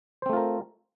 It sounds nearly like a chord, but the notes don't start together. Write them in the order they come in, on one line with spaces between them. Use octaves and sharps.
C5 C4 A3 F4 A#4